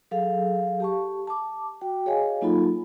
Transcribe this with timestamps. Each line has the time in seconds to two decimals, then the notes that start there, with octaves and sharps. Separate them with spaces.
0.11 F#3 G#4 A4 F5
0.80 G4 A5 C#6
1.27 A5 D6
1.82 F#4 G5
2.06 G#4 C#5 D#5 F5 G#5
2.41 F#3 A#3 D#4 F4 A4 B5